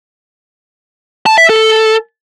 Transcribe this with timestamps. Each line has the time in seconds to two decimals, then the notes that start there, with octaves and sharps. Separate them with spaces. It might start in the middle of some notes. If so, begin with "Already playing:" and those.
1.26 A5
1.38 E5
1.49 A4